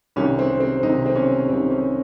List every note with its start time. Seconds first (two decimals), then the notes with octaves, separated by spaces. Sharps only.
0.16 C2 C3 D#3 C#4
0.39 C4
0.60 C4
0.82 C2 C3 D#3 D#4
1.06 C4
1.15 C#4
1.49 C2 C3 D#3 C4
1.70 C#4